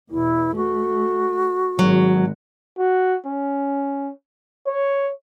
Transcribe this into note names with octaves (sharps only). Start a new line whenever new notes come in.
E2 B2 E4
A3 F#4
G#1 F#3 G#3
F#4
C#4
C#5